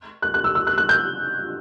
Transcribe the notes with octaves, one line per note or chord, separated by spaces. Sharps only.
F#6
F#6
E6
E6
F#6
F#6
G6